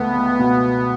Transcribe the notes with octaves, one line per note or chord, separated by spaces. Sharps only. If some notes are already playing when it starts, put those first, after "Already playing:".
Already playing: C#2 A3 B3
C#2
B2